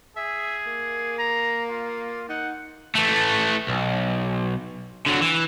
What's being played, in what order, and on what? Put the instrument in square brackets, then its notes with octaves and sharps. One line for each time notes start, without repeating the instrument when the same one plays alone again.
[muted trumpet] G#4 [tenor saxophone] E5
[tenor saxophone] A#3
[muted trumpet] A#5
F4
[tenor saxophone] D#4 [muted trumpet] F#5
[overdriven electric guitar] E3 A3
B1
D3 F#3
E3